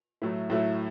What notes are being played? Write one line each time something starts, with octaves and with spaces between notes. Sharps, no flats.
A2 F#3 A3 E4
A2 F#3 A3 E4